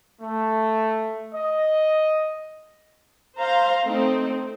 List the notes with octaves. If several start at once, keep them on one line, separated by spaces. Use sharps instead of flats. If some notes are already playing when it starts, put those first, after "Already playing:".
A3
D#5
C5 F5 A#5 C6
A3 C4 D#4